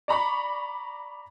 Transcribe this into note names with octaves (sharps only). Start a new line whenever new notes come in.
D5 A#5 B5 C#6